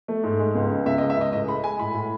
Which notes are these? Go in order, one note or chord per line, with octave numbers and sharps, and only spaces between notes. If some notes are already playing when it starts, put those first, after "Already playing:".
A3
G#2
G#3
C#2
C#3
C#2 E5
D#5
G#3
E5
C#2 D#5
A2 D#5
G#3 B5
G#3 G#5
A2 B5
A2